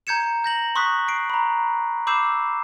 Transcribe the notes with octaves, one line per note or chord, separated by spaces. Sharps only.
A#5 G6 G#6 C#7 E7
G6 A#6 F#7
C6 C#6 D#6 F#6 B6
C7 D7
A#5 B5
B5 D6 E6 G6 C7 E7